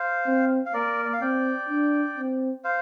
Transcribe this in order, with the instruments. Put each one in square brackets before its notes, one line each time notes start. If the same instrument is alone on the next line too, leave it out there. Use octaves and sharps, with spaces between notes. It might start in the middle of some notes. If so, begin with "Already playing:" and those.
Already playing: [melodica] C5 F5
[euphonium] C4
[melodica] F5
[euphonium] A#3 [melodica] A#4 D5
[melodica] D5
F5
[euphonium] C4 [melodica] D5 G5
[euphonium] D4
C4
[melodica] C5 F5